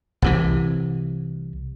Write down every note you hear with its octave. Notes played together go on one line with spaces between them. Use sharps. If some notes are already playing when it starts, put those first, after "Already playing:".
C2 C3 E3